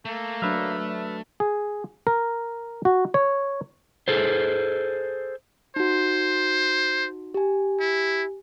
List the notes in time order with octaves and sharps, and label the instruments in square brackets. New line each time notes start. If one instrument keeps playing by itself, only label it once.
[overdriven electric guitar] A3 [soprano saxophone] A#3
[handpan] F#3 D4 [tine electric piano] B4 E5 F6
[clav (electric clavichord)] G#4
A#4
F#4
C#5
[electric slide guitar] G#4 A4 C5
[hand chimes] D#4 F#4 [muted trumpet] C5
[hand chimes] G4 G#5
[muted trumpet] E4